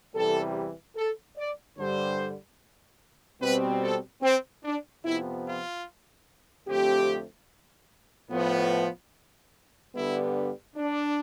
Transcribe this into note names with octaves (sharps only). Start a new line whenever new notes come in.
E2 C3 E3 G3 A4
A4
D5
G2 D3 G3 C5
B2 G3 C4 B4
A4
C4
D4
F2 C3 F3 B3 E4
F4
F2 D3 A3 C4 G4
A2 F3 B3
G2 D3 G3 B3 E4
D4